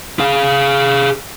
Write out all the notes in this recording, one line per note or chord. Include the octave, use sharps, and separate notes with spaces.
G#4 F5